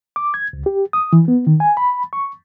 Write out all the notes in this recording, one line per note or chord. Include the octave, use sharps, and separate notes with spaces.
D6
G#6
C#2
G4
D#6
E3
B3
D#3
G#5
B5
C#6